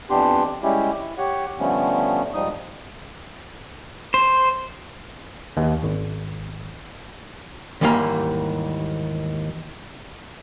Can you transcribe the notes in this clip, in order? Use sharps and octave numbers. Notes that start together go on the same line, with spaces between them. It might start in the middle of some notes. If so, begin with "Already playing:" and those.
F2 E3 B3 D4 G4 C6
G3 G#3 C#4 E4 G4
E4
G4 C#5 F#5
D3 F3 G3 A3 B3 C#4
G#2 F3 G3 D#4 D#6
C5
D#2
G#1
D#2 G#2 E3 G3 A#3 F5